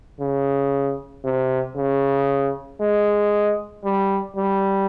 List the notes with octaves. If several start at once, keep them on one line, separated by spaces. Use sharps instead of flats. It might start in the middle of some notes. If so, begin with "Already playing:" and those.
C#3
C3
C#3
G#3
G3
G3